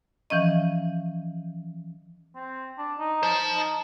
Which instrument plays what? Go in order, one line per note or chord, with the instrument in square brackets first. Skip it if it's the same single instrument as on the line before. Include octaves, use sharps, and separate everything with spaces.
[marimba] E3 F3 C#4 D#5
[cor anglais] C4
D4
D#4
[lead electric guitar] C5 A5
[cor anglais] D#4